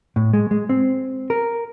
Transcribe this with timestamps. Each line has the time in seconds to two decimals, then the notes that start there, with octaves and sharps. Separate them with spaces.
0.16 A2
0.33 G#3
0.51 G#3
0.69 C4
1.30 A#4